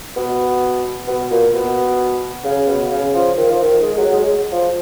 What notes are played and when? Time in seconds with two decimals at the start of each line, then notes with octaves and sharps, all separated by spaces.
0.16 B2
1.08 B2
1.31 A#2
1.54 B2
2.44 C#3
2.68 B2
2.91 C#3
3.14 F3
3.37 D#3
3.50 F3
3.62 D#3
3.82 G#3
3.98 F#3
4.13 G#3
4.52 F3